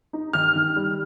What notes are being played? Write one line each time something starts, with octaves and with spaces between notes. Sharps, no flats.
D#4
D#3 F6
D#3
G3